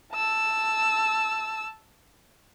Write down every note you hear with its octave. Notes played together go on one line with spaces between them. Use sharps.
A5 E6